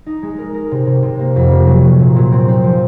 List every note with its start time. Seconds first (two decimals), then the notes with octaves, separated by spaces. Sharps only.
0.06 D#4
0.23 G#3
0.38 A#4
0.54 A#4
0.71 C3
0.87 C3
1.03 C3
1.19 A#3
1.36 F2
1.52 C3
1.67 F#3
1.84 F#3
1.99 A#2
2.16 A#2
2.32 C4
2.48 C4
2.64 F3